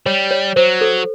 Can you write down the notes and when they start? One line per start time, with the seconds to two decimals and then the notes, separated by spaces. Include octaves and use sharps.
0.06 G3 C#5
0.31 C#5
0.56 F#3 C5
0.81 A4